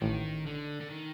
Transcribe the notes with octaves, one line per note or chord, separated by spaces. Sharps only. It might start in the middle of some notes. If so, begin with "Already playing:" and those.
A1 A2 D#3
D3
D3
D#3